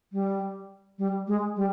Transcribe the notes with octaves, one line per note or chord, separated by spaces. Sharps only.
G3
G3
G#3
G3